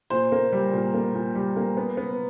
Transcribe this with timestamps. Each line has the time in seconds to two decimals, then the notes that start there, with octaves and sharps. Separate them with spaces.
0.10 A#2 C5
0.32 A#3
0.52 G3
0.73 A#2
0.94 A#3
1.15 A#2
1.35 G3
1.57 A#3
1.77 B3
1.97 B3